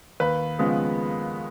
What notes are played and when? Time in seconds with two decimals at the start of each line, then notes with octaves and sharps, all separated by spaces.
0.20 D#2 B4
0.59 C#3 F3 G#3 B3